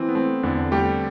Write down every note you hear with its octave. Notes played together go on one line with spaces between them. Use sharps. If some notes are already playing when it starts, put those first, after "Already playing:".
Already playing: E3 C4
B3
A3 C4
E2 D3 D4
G3 A3 G4